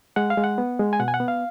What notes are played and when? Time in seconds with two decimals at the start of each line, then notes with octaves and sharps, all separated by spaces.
0.16 G#3 F#5
0.30 F5
0.37 G#3
0.44 F#5
0.58 B3
0.79 G#3
0.93 G#5
1.00 B2 F#5
1.08 G#5
1.14 F#5
1.20 B3
1.28 F5